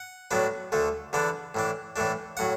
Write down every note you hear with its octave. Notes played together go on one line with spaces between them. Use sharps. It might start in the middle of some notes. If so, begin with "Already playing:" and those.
Already playing: F#5
A2 F#3 B3 D4
D2 D3 A3
E2 D3 B3 D4
A2 E3 D4
A2 E3 A3 D4
A2 F#3 F#5